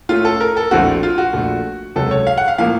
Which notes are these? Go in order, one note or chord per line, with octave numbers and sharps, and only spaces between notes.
A2 A3 C#4 F4
A4
A#4
A4
A#1 A2 A3 C4 F#4
F4
F#4
A#1 A#2 A3
C#2 C3 F#3 A4
C#5
F5
F#5
F5
A2 F3 A#3 F5